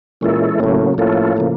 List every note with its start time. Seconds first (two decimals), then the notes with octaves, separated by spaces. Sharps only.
0.21 A#2 E3 G#3 C#4 E4 A4
0.60 A2 C#3 F#3 A#3 C#4
0.98 A2 F3 A#3 C#4 F4 A4
1.37 C#3 F3 A#3